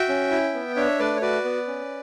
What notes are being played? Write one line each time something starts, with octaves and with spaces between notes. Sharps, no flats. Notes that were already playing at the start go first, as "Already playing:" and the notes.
Already playing: F#4 E5 G5
C#4
E4
B3
D4 C#5 E5
A3 B4 D5
C#5
F#4 B4 D5
B3
C#4